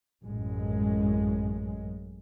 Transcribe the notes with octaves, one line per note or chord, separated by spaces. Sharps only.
A1 F#2 G#3